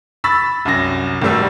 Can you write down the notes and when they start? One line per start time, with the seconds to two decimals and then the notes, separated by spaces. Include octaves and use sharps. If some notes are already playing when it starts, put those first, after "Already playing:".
0.24 B5 C#6 E6 A6 B6
0.65 C2 F#2 A#6
1.22 G#1 A2 G3 E6